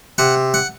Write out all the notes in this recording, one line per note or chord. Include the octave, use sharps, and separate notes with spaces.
C3 F#5
F#5